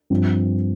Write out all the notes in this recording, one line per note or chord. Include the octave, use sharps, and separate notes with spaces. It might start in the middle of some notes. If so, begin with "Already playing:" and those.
G2 F3 C4